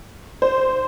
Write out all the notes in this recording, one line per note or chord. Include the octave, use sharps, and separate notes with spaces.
C5